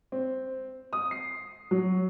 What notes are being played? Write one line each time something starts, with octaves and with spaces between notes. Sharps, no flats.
C4
D#6
C7
F#3